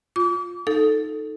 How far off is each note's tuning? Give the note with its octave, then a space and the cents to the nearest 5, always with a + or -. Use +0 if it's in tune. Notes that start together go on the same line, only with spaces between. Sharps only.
F4 +10 D6 -40
D#4 +0 A4 +0